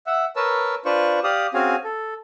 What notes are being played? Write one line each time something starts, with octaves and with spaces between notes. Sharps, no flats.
E5 F#5
A#4 B4 C#5 A5 E6
D4 F4 B4 C5 D5 C#6
G4 D5 F5 D#6
C4 C#4 F#4 G#4 F5 G#5
A4